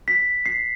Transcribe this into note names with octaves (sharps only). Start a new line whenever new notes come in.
B6
C7